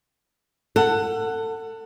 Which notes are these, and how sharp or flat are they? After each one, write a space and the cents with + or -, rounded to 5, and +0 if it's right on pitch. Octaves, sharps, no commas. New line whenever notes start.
A4 +30 F#5 +0